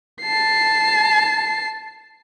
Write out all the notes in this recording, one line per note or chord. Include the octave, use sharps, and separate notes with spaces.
A5 C7